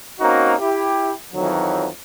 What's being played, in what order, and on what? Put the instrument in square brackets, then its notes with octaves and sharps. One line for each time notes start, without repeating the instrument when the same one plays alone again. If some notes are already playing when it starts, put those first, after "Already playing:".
[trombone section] A#3 C4 C#4 D#4 F#4
E4 G4
F2 D#3 E3 F#3